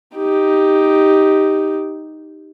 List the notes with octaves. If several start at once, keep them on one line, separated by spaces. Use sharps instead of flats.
D#4 G4